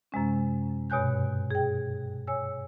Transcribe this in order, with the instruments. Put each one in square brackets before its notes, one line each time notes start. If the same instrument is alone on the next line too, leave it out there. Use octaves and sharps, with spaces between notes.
[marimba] F#2 C3 G#3 C#4
G2 B2 C#5 G#5 F#6 G6
G#4 G5
C#5 G#5 E6